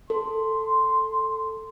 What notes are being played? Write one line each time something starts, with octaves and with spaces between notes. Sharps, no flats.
A4 C6